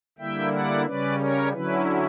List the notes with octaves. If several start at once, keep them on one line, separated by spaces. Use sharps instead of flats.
D3 G3 A#3 E4 E5 G5
D5 F#5
C#3 G3 C#4 B4 D5
A#4 C#5
D3 F#3 C#4 E4 B4